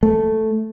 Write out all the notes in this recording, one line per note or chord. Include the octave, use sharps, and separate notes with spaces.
A3